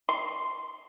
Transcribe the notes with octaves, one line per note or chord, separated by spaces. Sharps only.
C6